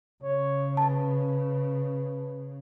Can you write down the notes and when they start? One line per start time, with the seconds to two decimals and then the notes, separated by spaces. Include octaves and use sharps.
0.24 C#3 C#5
0.77 B4 A5